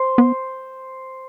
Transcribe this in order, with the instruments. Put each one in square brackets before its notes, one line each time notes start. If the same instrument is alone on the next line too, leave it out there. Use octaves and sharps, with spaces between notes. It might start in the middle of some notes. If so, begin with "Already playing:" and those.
Already playing: [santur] C5
[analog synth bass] B3